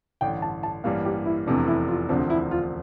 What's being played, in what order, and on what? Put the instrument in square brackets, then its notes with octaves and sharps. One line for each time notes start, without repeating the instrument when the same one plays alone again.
[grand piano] A1 G2 D3 [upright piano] G5
[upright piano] A5
A5
[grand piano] A1 G2 E3 G3 A#3 [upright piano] F5
[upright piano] G4
E4
[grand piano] F1 E2 C3 E3 A3 [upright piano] D4
[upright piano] E4
F4
[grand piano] E1 D2 C3 F3 C4 [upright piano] D4
[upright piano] E4
F4